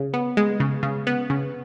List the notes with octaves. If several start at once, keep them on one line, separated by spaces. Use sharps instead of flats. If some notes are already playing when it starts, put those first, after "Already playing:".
Already playing: C#3
B3
G#3
C#3
C#3
B3
C#3